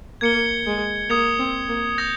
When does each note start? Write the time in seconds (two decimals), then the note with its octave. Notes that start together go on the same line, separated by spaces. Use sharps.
0.21 A#3 G#6 C#7 G7
0.66 G#3
1.09 A#3 D#6 G#6 C#7 F7
1.39 C4
1.69 A#3
1.98 D#6 G6 A#6 F7